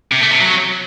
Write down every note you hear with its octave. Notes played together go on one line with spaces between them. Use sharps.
C3
A3
C3
F#3